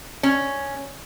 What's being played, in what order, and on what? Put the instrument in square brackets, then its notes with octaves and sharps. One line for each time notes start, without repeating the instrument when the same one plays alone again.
[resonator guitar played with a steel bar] C#4